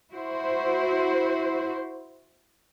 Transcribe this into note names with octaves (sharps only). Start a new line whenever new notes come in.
E4 F#4 C5